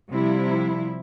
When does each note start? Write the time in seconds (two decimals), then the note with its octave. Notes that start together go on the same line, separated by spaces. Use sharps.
0.11 C3 F3 G3 E4